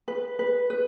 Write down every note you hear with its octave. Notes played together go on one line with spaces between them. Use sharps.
B4
B4
B4